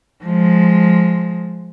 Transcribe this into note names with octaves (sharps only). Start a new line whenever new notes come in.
F3 G#3